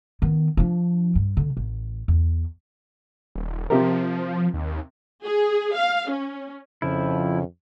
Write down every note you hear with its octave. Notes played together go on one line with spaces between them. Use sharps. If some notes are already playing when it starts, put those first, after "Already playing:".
D#3 B3
F3 D4
G2
D3
A1
E2
D#1
C3 F3 G4 A#4
D#2
G#4
F5
C#4
F2 C#3 F3 E4